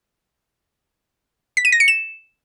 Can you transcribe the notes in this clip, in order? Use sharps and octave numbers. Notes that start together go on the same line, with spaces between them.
B6
D#7
A#6
C#7
E7